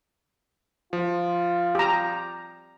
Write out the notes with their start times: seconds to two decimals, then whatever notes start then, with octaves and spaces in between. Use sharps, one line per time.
0.93 F3 F4
1.75 G4 A#5